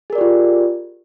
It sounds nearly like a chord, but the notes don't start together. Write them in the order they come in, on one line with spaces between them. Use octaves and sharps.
G#4 A#4 D5 G4 F4